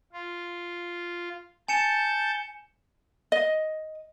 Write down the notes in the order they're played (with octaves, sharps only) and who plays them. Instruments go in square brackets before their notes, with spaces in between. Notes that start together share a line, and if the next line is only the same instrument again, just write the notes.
[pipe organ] F4
[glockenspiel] G#5 C#7 E7 [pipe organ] A5 G6
[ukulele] D#5